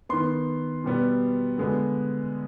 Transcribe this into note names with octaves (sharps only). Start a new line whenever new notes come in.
D#3 B3 C6
B2 G3 B3
D3 G#3 B3